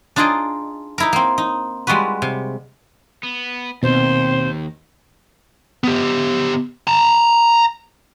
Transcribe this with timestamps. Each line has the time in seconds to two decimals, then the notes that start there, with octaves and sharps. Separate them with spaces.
0.16 D4 D#4 F4 G#4 D5 D#5
0.98 D#4 E4 A#4
1.13 A#3 C4
1.38 D#4
1.87 G3 G#3 F4 F#4 B4
2.22 C3
3.24 B3
3.83 D#2 B2 C4 C5
5.84 B3 G4
6.87 A5 A#5